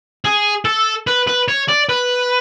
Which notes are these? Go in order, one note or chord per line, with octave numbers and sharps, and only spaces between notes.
G#4
A4
B4
B4
C#5
D5
B4